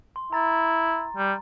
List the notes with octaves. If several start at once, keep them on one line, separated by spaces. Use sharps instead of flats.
C6
E4 A#5 A6
G3